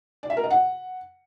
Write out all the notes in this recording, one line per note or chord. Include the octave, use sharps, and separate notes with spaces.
D5
E5
A#4
D#5
F#5